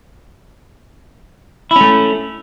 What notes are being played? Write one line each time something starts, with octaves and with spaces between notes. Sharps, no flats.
A3 C#4 E4